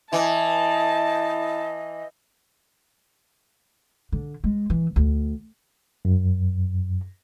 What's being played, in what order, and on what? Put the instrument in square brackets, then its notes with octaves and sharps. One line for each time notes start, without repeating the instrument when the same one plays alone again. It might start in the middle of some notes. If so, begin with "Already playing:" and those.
[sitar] E3 [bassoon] E4 [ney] D#5 [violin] A5
[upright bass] D3
G#3
E3
D2
[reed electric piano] F#2